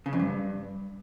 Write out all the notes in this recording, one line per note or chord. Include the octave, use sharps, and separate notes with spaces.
C#3
F2
G2